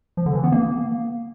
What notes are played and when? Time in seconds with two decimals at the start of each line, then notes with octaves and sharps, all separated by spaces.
0.17 F3
0.26 D3
0.35 E3
0.44 B3
0.52 A#3